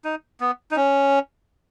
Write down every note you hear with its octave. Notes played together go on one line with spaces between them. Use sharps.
D#4
B3
D#4
C#4